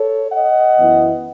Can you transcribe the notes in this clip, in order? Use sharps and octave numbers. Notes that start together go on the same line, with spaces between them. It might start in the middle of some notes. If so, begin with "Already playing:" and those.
Already playing: A4 C#5
D#5 F#5
F#2 E3 B3 E4